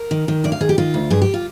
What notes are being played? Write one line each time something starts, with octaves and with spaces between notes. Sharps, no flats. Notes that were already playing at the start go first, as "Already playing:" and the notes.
Already playing: A#4
D#3
D#3
D2 D5
F5
D#3 G#4
G4
D#3 F4
D2
G2 G#4
G4
F4